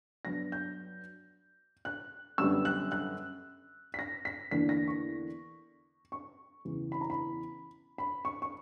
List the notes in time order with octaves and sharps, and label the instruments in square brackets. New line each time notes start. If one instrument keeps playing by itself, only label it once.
[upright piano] G2 F#3 B3 D4 A#6
G6
F#6
F#2 D3 G3 B3 E6
F#6
F#6
B6
A#6
B6
E2 D3 A#3 D4 B6
A#6
C#6
C#6
E2 C#3 E3
B5
A#5
B5
B5
C#6
C#6